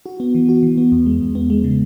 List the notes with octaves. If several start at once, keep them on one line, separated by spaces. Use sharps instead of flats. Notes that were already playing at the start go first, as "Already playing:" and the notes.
F#4
B3
E3
F#4
E3
B3
E2
G#3
E2
B3
G#3
C#3